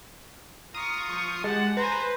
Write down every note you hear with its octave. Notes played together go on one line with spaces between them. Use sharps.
F4 A#5 C#6 D#6
F3 C#6
G#3 G4 F#5 A5
B4 C5 G#5 A#5